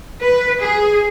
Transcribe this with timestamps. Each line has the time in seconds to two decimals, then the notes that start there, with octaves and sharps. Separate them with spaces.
0.20 B4
0.61 G#4